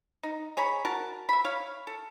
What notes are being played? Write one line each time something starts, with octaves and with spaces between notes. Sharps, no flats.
D#4
G#4 C#5 A#5 B5
F#4 A#4 A5
E5 B5
C#5 F5
A4